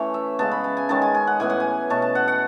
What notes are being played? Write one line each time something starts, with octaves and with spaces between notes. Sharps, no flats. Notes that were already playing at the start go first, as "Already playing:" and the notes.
Already playing: E3 A3 C#4 C#5
E5
C#3 G#3 B3 A5
B5
A5
G#5
D#3 G#3 C#4 A5
G#5
G#5
F#5
A2 E3 B3 G#5
F#5
G#5
B2 A3 C#4 A5
A5
F#5
F#5